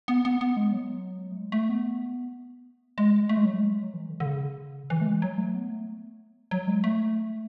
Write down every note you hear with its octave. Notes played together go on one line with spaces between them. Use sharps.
B3
B3
B3
G#3
F#3
A3
G#3
A3
B3
G#3
A3
G#3
F#3
G#3
F#3
E3
D3
D3
C#3
E3
A3
G#3
F#3
A3
B3
A3
F#3
G#3
A3